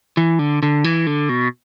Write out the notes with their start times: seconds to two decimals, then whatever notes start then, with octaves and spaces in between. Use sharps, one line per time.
0.17 E3
0.39 D3
0.63 D3
0.84 E3
1.07 D3
1.29 B2